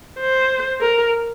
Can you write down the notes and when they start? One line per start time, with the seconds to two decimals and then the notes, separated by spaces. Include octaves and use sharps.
0.20 C5
0.81 A#4